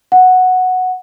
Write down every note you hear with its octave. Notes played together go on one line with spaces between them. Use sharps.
F#5